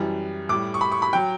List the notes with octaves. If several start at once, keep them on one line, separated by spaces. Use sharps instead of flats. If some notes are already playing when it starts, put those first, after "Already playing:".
Already playing: F#2 E3 G3
A2 G3 D6
C#6
B5
C#6
B5
F#3 G5